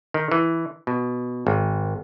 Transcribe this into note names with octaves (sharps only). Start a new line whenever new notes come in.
D#3
E3
B2
G#1